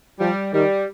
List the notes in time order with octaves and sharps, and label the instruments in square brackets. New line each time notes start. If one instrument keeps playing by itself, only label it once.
[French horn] F3 [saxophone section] G3
[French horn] D#3 [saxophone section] G3